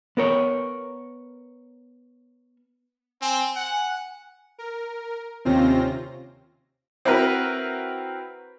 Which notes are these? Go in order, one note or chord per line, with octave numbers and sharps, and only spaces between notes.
B3 A#4 C#5
C4 G#5
F#5
A#4
D#2 C3 C4 C#4 F4 A#6
C4 E4 F#4 A#4 B4